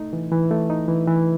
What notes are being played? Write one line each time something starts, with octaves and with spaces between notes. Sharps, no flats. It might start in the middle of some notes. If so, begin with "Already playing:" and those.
Already playing: A3 D#4
E3
E3
A3
D#4
E3
E3